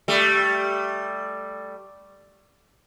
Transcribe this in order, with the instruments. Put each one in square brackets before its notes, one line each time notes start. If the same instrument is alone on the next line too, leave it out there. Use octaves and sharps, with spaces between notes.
[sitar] G3 A3